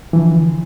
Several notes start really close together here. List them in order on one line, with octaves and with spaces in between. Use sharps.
E3 F3 D3